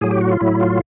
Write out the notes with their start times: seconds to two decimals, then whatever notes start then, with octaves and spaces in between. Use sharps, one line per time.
0.01 A2 F#3 G#4
0.11 G4
0.21 F#4
0.31 F4
0.41 A2 F#3 E4
0.60 F4